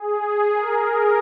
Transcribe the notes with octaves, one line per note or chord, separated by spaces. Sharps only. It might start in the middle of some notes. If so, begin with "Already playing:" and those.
Already playing: G#4
A#4